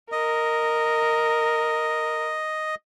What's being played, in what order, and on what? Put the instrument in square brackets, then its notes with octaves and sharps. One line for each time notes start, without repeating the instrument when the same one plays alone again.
[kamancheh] A#4 [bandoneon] D#5